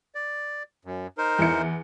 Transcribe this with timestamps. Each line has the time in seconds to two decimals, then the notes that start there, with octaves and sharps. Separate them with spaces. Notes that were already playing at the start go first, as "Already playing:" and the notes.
0.15 D5
0.85 F#2
1.18 D#4 A#4 C5
1.39 E2 E4 C#7